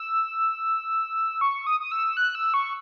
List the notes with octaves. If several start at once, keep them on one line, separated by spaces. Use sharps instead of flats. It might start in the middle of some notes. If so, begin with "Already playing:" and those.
Already playing: E6
C#6
D#6
D#6
E6
F#6
E6
C#6